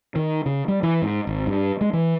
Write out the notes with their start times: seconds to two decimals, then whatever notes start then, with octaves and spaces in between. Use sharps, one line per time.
0.16 D#3
0.46 C#3
0.68 G3
0.83 E3
1.02 G#2
1.27 G#1
1.47 G2
1.81 G#3
1.93 E3